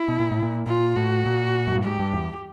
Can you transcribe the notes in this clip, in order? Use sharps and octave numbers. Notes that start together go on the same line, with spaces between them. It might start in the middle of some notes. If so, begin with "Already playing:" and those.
Already playing: E4
B2
A#2
A2
A#2
A#2 F4
A2 F#4
A#2
F#2
G2
G#2 G4
G2
E2